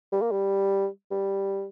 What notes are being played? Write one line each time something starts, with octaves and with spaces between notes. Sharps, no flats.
G3
A#3
G3
G3